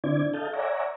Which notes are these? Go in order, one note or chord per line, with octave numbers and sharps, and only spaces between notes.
D3 C4 D4 E4 D5 G#6
A4 D#5 F5 A5 G6
C#5 D5 E5 F#5 G#5 A#5